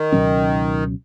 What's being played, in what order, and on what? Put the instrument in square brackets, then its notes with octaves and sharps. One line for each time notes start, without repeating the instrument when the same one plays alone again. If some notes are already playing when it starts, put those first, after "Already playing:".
Already playing: [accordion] D#3
[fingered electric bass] C#2 B2 F#3 C#4